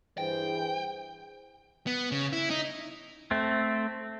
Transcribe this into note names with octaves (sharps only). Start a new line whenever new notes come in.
G2 E3 G#4 C5 G5
B3
C#3
E4
D#4
A3 C4